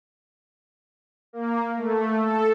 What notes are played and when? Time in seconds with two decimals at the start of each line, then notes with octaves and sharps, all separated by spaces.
1.33 A#3
1.77 A3
2.18 A4